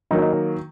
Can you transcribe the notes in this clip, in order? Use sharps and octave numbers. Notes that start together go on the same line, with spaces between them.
D#3 F#3 A#3 D#4
D#4